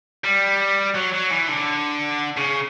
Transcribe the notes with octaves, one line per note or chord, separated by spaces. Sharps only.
G3
F#3
F#3
E3
D3
C#3